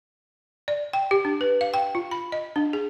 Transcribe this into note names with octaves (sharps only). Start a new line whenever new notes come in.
D5
G5
G4
D4
B4
F5
G5
F4
B5
D#5
D4
G#4